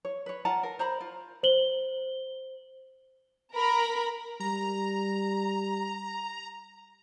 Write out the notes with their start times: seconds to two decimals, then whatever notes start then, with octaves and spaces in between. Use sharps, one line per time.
0.05 C#5
0.26 B4 C#5
0.45 F4 F#5 A5 A#5
0.63 A#4
0.79 C5 A#5 B5
1.01 F4
1.43 C5 F#7 G7
3.55 A#4 A#5 B5
4.40 G3 A#5